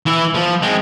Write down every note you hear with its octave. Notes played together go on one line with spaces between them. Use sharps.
E3 E4
F3
G#3 C4